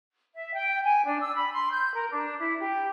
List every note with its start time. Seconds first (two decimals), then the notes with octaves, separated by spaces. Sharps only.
0.35 E5
0.53 G5
0.83 G#5
1.06 D4
1.20 E6
1.34 B5
1.53 C6
1.70 G6
1.93 A#4
2.10 D4
2.39 E4
2.60 G4